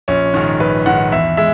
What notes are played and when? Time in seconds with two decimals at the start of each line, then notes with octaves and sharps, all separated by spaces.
0.08 A#1 C#4
0.34 G#2 D#3
0.60 A#1 B4
0.86 G#2 D#3 F#5
1.12 E2 E5
1.37 G#3 E5